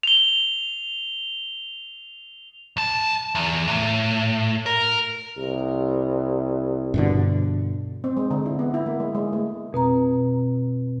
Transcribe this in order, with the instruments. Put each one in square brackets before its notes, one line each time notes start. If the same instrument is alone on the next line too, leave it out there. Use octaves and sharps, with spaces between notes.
[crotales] F7 G7
[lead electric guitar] B1 A5
E2
A2
A#4
[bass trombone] C2
[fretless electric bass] G2 B2 D3
[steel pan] C4
G#3
D3
E4
B3
E4
A#3
G#3
G#3
A3
[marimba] F2 B2 C4 A#5